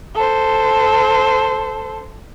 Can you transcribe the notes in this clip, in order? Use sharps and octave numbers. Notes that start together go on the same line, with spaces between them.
A4 C5